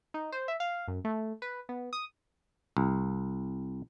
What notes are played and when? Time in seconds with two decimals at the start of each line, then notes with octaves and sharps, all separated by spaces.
0.14 D#4
0.32 C5
0.48 E5
0.60 F5
0.88 F#2
1.05 A3
1.42 B4
1.69 B3
1.93 D#6
2.77 C2